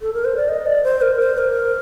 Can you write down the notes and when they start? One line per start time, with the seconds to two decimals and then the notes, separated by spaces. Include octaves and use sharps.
0.02 A4
0.14 A#4
0.25 C5
0.37 D5
0.49 D#5
0.66 D5
0.84 C5
1.02 A#4
1.20 C5
1.38 A#4